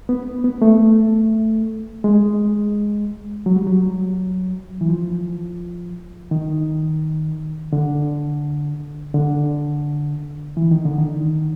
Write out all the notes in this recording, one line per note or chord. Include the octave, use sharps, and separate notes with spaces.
B3
B3
A3
G#3
F#3
G3
F#3
E3
F3
D#3
D3
D3
E3
D#3
D3
D#3